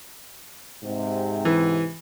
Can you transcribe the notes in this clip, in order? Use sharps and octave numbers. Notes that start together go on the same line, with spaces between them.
G#2 C3
E3